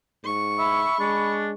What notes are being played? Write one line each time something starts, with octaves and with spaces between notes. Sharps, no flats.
G#2 C#6
E5 B5
G#3 D4